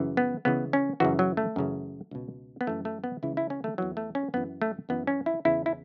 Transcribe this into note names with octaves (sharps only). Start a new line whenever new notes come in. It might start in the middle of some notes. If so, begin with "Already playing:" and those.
Already playing: F#2 C#3 E3
B3
C#2 C#3 E3 B3
C#4
F#2 C#3 E3 F#4
F#3
A3
F#2 C#3 E3
C#2 B2
B3
F#2 E3 A3
A3
B3
C#2 C#3 E3 E4
E4
C#4
A3
E2 E3 F#3
A3
C#4
F#2 E3 B3
A3
F#2 E3 B3
C#4
E4
E2 C#3 E3 E4
E4